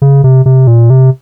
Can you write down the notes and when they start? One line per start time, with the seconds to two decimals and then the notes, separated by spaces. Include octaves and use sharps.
0.02 C#3
0.24 C3
0.46 C3
0.67 A#2
0.90 C3